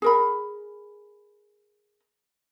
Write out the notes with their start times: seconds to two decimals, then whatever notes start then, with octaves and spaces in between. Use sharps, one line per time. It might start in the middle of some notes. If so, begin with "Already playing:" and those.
0.02 G#4 A#4 B5